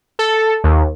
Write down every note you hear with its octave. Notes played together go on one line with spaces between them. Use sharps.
A4
D#2